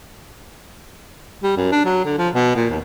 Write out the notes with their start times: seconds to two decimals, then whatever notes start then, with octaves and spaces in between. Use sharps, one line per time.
1.43 G3
1.57 F#2
1.72 D4
1.86 F#3
2.05 D3
2.18 F3
2.34 B2
2.56 A#2
2.70 D#2